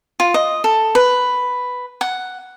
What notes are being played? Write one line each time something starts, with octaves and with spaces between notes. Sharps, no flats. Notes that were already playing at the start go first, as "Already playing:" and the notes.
F4
D#5
A4
B4
F#5